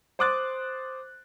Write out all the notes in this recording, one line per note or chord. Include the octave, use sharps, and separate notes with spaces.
C5 C6 D6 D#6 F#6 A6